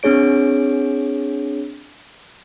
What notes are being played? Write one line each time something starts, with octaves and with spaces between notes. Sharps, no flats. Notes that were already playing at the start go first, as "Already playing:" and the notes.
C4 D4 G#4 C#5 D7